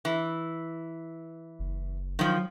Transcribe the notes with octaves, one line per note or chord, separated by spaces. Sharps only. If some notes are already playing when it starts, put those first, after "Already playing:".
E3
F#1
D#3 F3 F#3